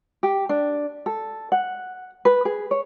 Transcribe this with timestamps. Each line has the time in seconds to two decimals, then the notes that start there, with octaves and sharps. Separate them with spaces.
0.23 G4
0.49 D4
1.06 A4
1.52 F#5
2.25 B4
2.45 G#4
2.71 C#5